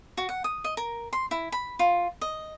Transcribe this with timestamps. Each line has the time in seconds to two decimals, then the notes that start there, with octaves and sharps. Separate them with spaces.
0.17 F#4
0.29 F#5
0.44 D#6
0.64 D#5
0.77 A#4
1.13 C6
1.31 E4
1.52 B5
1.79 F4
2.21 D#5